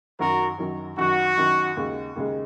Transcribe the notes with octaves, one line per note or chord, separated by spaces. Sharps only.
F#2 D#3 F#3 F#4 A#4
F#2 D#3 F#3
F#2 D#3 F#3 F#4
F#2 D#3 F#3
D#2 C#3 G#3
D#2 C#3 G#3